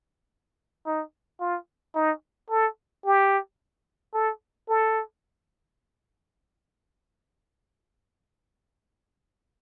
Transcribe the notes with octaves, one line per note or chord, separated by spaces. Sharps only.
D#4
F4
D#4
A4
G4
A4
A4